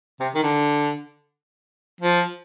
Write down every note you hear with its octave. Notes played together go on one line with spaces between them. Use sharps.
C3
D#3
D3
F3